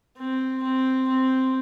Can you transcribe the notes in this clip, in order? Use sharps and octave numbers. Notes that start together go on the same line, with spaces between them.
C4
C4
C4